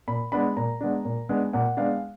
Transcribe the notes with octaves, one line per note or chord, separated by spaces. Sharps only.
A#2 B5
G#3 B3 D4 B5
A#2 A#5
G#3 B3 D4
A#2
G#3 B3 D4
A#2 F#5
G#3 B3 D4 F5